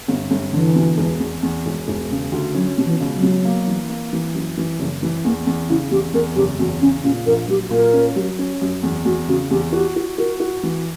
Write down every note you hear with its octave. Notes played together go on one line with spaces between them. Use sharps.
G1 B3
G1 G3
D3 E3
B2
E1
E2
E2
E1
E1
C#3
D2
F#3 C#4
B2
E3
C#2
F#3
B2
A#3
E3
A#3
E3
F#2
E3
F#1
E3
E2 A#3
E2
C#3 E4
E2 G4
E2 A#4
F#1 G4
E2 F#4
C#3 C#4
A#2 C#4
A#1 A#4
F#3 G4
A#2 A#4
C#4
F#3
C#4
F#2
E2
E2 F#4
C#3 F#4
E2 G4
F#4 G4
F#4
F#4 A#4
F#4
E3